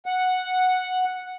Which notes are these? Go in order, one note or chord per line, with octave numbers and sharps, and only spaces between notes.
F#5